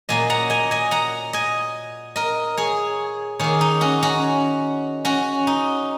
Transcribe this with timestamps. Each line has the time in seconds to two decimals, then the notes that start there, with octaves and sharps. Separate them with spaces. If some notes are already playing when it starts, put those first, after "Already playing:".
0.09 A#2 F#3 A#3 D#5 G#5
0.30 F#5 A#5
0.50 D#5 G#5
0.71 D#5 G#5
0.91 F#5 A#5
1.33 D#5 G#5
2.16 A#4 D#5
2.57 G#4 C#5
3.39 D#3 A#3 G#4 C#5
3.61 D#4
3.81 C#4 F#4
4.03 C#4 F#4
5.05 C#4 F#4
5.47 D#4